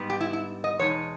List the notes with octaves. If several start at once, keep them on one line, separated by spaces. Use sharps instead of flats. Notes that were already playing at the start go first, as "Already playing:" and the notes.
Already playing: G#2 G3 B3 D#4
G4
E4
E4
D#5
E2 B2 G#3 D#4 C#5